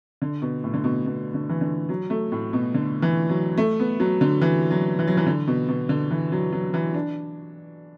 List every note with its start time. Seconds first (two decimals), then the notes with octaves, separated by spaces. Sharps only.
0.22 D3
0.42 B2
0.64 A2
0.74 D3
0.84 B2
1.06 B2
1.34 D3
1.49 E3
1.61 D3
1.89 F#3
2.10 A3
2.32 A2
2.53 B2
2.74 D3
3.02 E3
3.29 F#3
3.58 A3
3.80 B3
4.00 F#3
4.21 D3
4.42 E3
4.71 F#3
4.99 E3
5.08 F#3
5.17 E3
5.26 D3
5.47 B2
5.68 B2
5.89 D3
6.11 E3
6.32 F#3
6.53 F#3
6.74 E3
6.94 D4